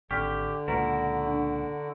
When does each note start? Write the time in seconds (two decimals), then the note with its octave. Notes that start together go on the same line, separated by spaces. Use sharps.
0.11 G#1 D3 G4 C#6 F6 B6
0.68 C#2 A#2 E4 F#4 A#4 B4 A#5
1.27 D4